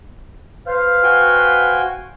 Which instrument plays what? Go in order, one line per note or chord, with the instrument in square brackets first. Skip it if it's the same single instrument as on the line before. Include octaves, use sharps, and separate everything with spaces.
[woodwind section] B4 C5 F5
[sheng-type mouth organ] F#4 G5 G#5